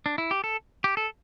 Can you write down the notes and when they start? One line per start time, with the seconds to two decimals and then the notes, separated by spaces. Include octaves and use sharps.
0.06 D4
0.18 E4
0.31 G4
0.44 A4
0.84 G4
0.97 A4